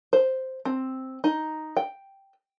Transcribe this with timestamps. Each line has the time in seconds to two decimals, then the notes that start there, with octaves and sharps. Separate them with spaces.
0.13 C5
0.65 C4
1.24 D#4
1.77 G5